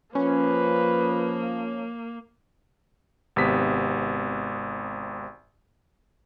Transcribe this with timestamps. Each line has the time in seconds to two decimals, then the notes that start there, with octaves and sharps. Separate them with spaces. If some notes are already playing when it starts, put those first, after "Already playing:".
0.15 F3 A#3 C#4 B4
3.36 G#1 C3 B3 B6